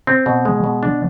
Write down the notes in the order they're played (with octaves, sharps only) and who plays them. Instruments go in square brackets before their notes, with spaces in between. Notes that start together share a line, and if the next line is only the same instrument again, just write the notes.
[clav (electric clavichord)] C4
B2
G#3
B2
D4